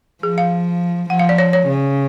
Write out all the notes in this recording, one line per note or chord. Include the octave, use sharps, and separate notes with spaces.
F3 G#4
F5
F3 F#5
F5
D5
C#5
C#5
C#3